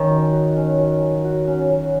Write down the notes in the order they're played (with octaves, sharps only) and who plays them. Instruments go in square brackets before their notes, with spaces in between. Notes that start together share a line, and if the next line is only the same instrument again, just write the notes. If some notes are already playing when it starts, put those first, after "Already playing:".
Already playing: [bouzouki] D#3 [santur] C#4
[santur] F#3
F#4
C#4
F#3
F#3
F#4
C#4
F#3